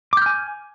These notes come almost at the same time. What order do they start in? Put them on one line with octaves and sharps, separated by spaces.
D6 G6 F6 G#5